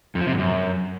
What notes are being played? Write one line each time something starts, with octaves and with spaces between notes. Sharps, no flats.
F2
F3
C3
G#2
F#2